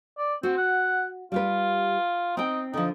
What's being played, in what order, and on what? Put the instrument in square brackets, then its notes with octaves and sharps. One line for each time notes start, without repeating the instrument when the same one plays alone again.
[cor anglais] D5
[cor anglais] C4 [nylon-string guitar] F#4
[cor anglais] F#5
[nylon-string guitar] G3 G4 B4 [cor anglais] F4
[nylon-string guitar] C4 G5 [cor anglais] D#4
[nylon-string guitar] D3 F3 [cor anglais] D#4